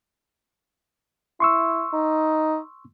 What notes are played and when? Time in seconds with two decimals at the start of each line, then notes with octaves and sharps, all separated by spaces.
1.40 E4 C6 C#6 E6
1.93 D#4